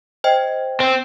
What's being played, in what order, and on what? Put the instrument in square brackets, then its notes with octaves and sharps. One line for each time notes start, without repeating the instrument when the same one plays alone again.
[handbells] C5 D#5 G5
[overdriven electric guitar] C4